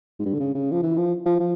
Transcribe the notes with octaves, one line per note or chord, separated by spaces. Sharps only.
G#2
G2
D3
C#3
C#3
F3
E3
F3
F3
F3